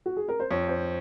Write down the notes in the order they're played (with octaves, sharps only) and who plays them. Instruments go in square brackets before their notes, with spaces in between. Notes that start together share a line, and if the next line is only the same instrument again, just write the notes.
[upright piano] F#4
G#4
A#4
C5
[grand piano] F2 [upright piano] C#5
[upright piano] C5